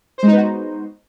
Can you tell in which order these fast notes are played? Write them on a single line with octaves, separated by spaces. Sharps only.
C5 G#3 D#4 B3 F#4